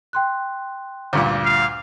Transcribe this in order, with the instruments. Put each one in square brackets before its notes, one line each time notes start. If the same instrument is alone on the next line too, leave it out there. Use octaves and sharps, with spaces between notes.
[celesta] G5 C6 F#6
[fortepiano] D2 G2 A#2
[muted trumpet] F5